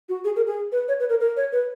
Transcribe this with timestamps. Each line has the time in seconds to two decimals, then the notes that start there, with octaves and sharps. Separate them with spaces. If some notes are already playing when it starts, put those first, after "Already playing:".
0.09 F#4
0.24 G#4
0.36 A#4
0.47 G#4
0.72 B4
0.88 C#5
1.00 B4
1.09 A#4
1.20 A#4
1.37 C#5
1.52 B4